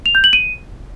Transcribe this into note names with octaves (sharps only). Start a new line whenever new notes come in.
F7
G6
F#7
D#7